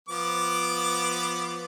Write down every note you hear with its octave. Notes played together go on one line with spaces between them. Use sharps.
F3 B3 D6